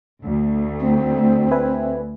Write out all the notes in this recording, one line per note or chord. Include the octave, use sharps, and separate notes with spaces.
D2
C4
B4 E5 G#5